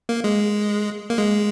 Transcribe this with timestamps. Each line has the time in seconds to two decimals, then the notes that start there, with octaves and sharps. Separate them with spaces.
0.09 A#3
0.24 G#3
1.10 A#3
1.18 G#3